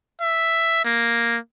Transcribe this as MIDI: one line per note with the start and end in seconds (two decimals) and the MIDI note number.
0.21 0.83 76
0.85 1.37 58